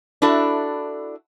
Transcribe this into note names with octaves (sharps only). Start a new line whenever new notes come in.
D4 E4 F#4 A4